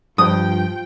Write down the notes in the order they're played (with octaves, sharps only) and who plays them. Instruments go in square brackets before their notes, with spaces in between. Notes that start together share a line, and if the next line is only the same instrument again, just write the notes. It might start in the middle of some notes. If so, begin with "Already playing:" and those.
[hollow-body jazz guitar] G2 [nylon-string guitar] F3 [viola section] F4 G5 [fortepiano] D#6